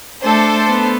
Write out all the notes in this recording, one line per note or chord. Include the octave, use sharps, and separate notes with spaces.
A3 D4 A4 C5
B3